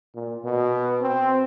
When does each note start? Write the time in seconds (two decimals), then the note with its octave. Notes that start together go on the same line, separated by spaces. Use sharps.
0.15 A#2
0.45 B2
1.01 C4